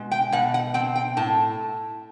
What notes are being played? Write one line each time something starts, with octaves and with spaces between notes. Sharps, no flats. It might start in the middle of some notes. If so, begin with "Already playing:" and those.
Already playing: B2 G#3
G5
B2 F#5
F#5
C4 G5
G5
A2 A5